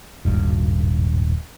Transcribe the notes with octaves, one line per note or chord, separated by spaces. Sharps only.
D#1 G#1 G2